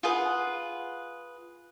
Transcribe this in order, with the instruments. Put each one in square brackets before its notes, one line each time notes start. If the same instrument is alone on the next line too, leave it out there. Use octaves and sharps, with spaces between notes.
[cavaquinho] F4 G#4 B4 F#5